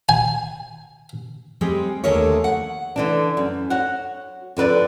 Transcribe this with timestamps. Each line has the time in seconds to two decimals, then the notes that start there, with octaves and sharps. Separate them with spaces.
0.09 G#5
1.61 G3 G#3 C4
2.04 D#2 D3 G#3 A3 A#4 C#5
2.44 F#5
2.96 D3 E3 D4
3.37 F#2
3.70 F#4 C#5 F#5
4.57 F2 D3 B4 D5